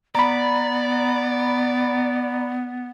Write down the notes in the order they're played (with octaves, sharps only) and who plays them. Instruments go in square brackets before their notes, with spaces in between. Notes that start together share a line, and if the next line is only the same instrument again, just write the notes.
[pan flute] B3 [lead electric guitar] D5 [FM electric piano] A#5 B5